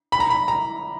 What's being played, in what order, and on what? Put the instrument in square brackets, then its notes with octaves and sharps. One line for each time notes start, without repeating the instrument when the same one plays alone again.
[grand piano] B5
A#5
B5
A#5